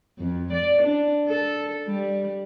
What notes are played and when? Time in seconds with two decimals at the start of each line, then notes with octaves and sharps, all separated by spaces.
0.18 F2
0.53 D5
0.82 D4
1.27 A4
1.87 G3